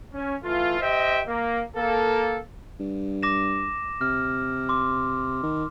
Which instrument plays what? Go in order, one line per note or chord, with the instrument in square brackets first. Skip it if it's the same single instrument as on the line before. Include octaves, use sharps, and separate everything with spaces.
[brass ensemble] C#4
E3 A3 F4
G4 C5 D#5 E5 G5
A#3
A#3 A4
[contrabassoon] G2
[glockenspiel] D6 A#6 E7
[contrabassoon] C3 [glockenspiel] F6
[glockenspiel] C6 D6
[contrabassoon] D#3